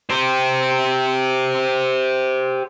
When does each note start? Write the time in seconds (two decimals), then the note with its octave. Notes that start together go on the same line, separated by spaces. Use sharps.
0.10 G4 C5